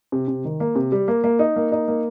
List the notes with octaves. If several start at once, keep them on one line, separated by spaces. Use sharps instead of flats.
C3
C3
D#3
A#3
C3
G3
A#3
A#3
D#4
A#3
D#4
A#3